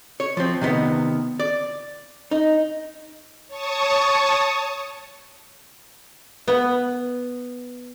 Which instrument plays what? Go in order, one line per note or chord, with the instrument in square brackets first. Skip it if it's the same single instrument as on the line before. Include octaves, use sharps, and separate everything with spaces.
[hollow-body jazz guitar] C#5
F3 C4
C3 D#3 B3
D5
D#4
[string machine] C#5 A5 C#6 D#6
[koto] B3